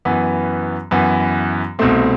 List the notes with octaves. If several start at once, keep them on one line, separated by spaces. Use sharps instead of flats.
F#2 E3 B3
F#2 E3 B3
C2 B2 A3 C4